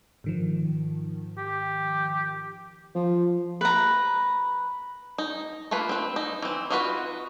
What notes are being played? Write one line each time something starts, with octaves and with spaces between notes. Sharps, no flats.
G#2 D#3 F3
G4
F3
B4 A#5
D#4
A3 A#3 F4 B4
C4 B4
D#4
E3 C4
D#4 F4 F#4 A#4 B4